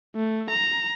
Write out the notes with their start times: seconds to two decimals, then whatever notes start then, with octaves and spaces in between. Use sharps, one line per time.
0.15 A3
0.50 A#5